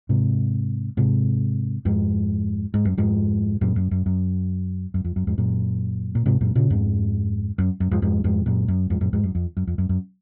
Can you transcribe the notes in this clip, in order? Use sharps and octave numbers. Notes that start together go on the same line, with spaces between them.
G#2 C3
G#2 C3
F2 G#2
G#2
F#2
F2 G#2
F#2 A#2
F#2
F#2
F#2
F#2
F2
F#2
F2 G#2
F#2 A#2
A#2
G#2 C3
F#2 A#2
A#2 C#3
F2 G#2
F#2
F#2
F2 G#2
F2 G#2
F2 G#2
F#2 A#2
F#2
F2 G#2
F#2 A#2
F2 G#2
F#2
F2
F#2
F2
F#2
F#2